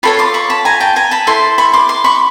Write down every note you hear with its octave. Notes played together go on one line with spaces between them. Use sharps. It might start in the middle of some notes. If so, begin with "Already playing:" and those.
F4 A4 C#5 B5 C#6
C6 D6
B5 C#6
A5 B5
G#5 A#5
G5 A5
G#5 A#5
A5 B5
E4 A4 C5 C6
B5 C#6
C6 D6
C6 D6
B5 C#6